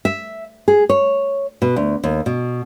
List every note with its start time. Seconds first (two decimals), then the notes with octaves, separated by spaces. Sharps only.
0.05 E5
0.68 G#4
0.90 C#5
1.62 B2
1.76 D2
2.04 D#2
2.26 B2